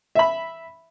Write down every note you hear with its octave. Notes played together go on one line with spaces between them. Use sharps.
E5 B5